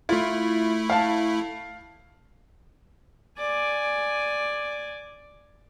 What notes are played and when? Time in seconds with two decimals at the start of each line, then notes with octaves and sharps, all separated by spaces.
0.09 A3 E4 F4
0.90 F5 A5
3.38 D5 G#5